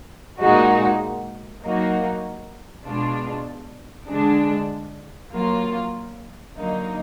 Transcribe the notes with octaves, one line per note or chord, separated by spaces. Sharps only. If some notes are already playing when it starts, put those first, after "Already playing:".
A#2 G#3 D#4 F#4
F#3 A#3 D#4 F#4
B2 G#3 D4 F4
D3 G#3 D4
F#3 A#3 F4
D3 F#3 A#3 D#4